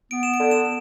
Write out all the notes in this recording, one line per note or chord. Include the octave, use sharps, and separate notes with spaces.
B3 D7
E7
D7
D3
E7